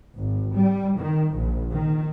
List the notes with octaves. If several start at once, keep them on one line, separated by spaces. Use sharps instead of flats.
G#1
G3
D#3
A#1
D#3